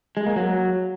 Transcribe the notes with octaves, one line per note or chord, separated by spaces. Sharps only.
G#3
A#3
F#3